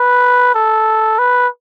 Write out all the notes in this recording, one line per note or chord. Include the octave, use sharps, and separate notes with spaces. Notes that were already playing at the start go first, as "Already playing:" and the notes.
Already playing: B4
A4
B4